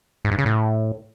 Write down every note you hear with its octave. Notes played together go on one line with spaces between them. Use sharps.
G#2
G2
C#3
A2